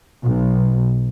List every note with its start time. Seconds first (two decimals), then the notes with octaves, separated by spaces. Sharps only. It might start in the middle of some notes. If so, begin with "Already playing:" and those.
0.23 B1